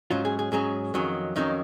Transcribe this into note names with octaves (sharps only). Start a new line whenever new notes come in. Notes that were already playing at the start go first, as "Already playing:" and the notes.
G#2 F#3 C#4 F4
G#4
G#4
G#2 F#3 C#4 G#4
F2 D#3 F#3 C#4
F2 D#3 F#3 C#4 D#4